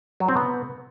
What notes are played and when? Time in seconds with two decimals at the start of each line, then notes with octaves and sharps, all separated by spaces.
0.20 F#3
0.28 C4
0.37 B3